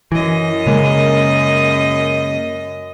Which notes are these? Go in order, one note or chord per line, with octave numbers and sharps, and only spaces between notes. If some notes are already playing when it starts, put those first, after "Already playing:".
F#2 E3 D#5
C#3 G#3 A#3